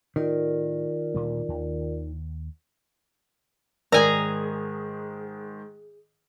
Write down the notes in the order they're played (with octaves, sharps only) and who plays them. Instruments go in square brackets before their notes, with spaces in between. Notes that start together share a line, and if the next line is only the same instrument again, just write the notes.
[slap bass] A2 [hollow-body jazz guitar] D#3 [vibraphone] F4 A#4 D5
[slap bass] D2 A#2 G3
D#2
[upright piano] G#2 D#3 F7 [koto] G#4 G#5 A#5 [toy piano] A#4 D5